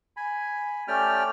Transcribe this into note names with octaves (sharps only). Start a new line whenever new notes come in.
G#5 B5
A3 C#4 G4 D5 G5 F6